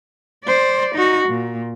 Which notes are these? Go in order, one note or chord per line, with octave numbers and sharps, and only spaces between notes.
C5 D5
D#4 F#4
A#2